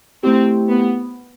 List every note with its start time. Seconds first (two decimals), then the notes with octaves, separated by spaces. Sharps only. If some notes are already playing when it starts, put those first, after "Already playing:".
0.23 A3 C4 E4 G4
0.69 B3